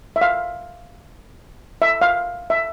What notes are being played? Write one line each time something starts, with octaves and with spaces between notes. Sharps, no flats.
E5
F5
E5
F5
E5